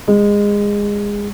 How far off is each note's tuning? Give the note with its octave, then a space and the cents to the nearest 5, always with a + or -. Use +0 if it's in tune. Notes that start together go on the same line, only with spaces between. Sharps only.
G#3 -20